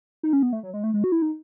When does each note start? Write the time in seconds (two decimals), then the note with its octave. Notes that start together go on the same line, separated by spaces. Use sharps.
0.23 D#4
0.33 C#4
0.43 B3
0.53 A3
0.63 F#3
0.74 G#3
0.84 A3
0.94 G#3
1.04 F#4
1.12 E4
1.22 D#4